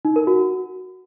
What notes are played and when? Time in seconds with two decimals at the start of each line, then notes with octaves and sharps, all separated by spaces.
0.05 D#4
0.16 A#4
0.27 F#4